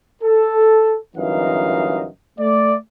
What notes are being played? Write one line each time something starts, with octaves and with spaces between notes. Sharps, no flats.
A4
G1 F#2 E3 D#4 D#5 F5
A3 D5